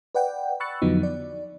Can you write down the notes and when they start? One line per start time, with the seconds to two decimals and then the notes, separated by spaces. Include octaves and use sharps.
0.15 B4 D5 F#5 G5
0.60 B5 C#6 E6 F#6 A6 C#7
0.82 F2 D3 F3 F#3 B3 D#4
1.03 D5